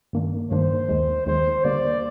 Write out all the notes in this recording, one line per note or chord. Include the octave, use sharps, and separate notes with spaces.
G2 D#3 A#3 D4
G2 D#3 A#3 D4 C5
D#2 D#3 G#3
D#2 D#3 G#3 C5
D3 G3 A#3 D5